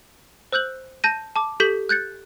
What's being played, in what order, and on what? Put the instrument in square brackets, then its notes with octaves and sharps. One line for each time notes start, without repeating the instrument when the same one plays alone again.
[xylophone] C5 E6 F#6 G6 F#7
A5 G6 A#6 D#7
A5 D6
G4 A4 G6 B6 F#7 G7
F#6 G6 A6 C#7